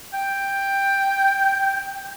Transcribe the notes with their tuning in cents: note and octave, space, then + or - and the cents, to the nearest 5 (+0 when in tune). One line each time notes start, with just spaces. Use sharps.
G5 +10